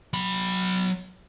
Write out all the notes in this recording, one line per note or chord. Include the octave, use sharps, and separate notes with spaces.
F#3 B5